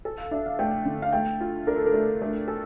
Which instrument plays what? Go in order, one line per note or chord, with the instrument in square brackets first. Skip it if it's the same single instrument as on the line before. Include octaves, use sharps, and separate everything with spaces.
[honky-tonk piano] A4
[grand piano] F5
[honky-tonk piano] D4 [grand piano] E5
[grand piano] F5
[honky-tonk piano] A3 [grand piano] G5
[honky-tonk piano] D3
[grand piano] F5
[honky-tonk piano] A3 [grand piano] G5
[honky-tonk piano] F4
[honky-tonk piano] D4 [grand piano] A#4
[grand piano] A4
A#4
[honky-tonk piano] A3
A3
A4